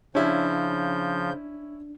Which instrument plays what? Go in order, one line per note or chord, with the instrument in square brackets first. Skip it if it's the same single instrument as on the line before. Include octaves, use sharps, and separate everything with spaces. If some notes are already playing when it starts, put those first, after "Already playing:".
[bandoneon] C#3 G6 [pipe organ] F3 [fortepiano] C#4 E4 [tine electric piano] D4